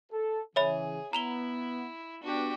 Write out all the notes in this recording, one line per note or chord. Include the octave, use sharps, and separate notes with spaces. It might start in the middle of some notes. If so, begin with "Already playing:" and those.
A4
C#3 E3 G#4 C#5 E5 B5
B3 E4 A#5 F7 G7
B3 D4 F#4 G4